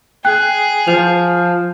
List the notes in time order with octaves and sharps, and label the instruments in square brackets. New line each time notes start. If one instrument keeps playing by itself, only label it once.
[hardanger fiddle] G#4 [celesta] G5 F#6
[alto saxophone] F3 [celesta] F7